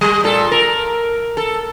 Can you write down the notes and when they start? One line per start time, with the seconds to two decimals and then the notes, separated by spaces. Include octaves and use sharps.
0.01 G3
0.24 A#2 A4
0.51 A#4
1.37 A4